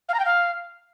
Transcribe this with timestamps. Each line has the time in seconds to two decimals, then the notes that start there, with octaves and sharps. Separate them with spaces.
0.09 F5
0.14 A#5
0.19 G5
0.25 F5